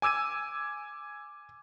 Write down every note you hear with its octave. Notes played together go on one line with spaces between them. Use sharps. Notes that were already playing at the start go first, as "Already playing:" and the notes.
G#5 D6 E6 G#6 D#7